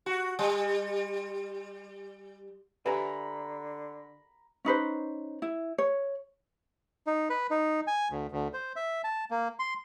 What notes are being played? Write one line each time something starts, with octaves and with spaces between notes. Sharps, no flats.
F#4
G3
D3 G4 B4 E5 G#5 A#5 B5
C#4 D#4 B4 C5
E4
C#5
D#4
B4
D#4
G#5
D2
D2
C5
E5
A5
A#3
C6